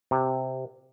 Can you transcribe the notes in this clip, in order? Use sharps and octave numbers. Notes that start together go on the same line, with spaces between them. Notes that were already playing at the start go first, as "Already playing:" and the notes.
C3